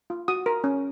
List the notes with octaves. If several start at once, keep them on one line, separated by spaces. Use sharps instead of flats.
F4
F#4 D#6
A#4
C#4